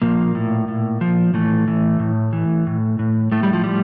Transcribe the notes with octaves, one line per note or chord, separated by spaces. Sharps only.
A#2 F3 A#3
A2
A2
F3
A2 E3 A3
E3
A2
E3
A2
A2
A2 A3
G3
F3
F3 G3